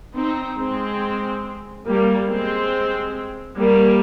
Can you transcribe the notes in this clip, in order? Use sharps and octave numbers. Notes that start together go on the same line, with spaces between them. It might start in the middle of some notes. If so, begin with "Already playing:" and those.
C4 D#4
G#3 C4
G3 A#3
G#3 C4
G3 A#3